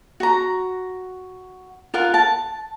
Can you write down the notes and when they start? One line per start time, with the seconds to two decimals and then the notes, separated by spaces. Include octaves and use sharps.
0.20 F#4 A#5
1.94 F4 A#4 F5 F#5
2.14 A5